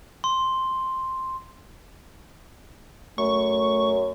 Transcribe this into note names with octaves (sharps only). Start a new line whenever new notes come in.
C6
F#2 A3 C#6